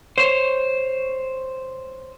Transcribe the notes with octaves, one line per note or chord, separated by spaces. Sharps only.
C5 C#5